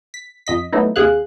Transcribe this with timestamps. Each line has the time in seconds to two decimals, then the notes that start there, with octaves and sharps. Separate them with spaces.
0.14 B6
0.47 F2 D#5 B6
0.73 F#3 A3 B3 D#4 E4
0.96 D#2 C3 G#4 F5 F#6